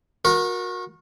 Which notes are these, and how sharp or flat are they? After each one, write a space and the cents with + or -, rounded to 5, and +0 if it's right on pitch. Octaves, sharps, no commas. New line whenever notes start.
F#4 -30 A#4 +15